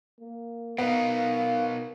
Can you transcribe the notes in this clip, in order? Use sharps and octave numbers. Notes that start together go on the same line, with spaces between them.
A#3
B2 B3 D#4 A#4 F5